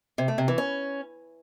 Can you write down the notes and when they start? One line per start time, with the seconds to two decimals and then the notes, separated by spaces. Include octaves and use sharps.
0.18 C3
0.28 A3
0.38 C3
0.48 E3
0.58 C#4